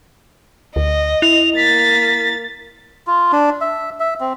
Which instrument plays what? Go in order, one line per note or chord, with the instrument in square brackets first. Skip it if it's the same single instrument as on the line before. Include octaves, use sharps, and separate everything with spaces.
[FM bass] D2 [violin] D#5
[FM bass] E4 [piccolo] F7
[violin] A#3 A6 [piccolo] B6
[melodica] F4
D4
E5
E5
C4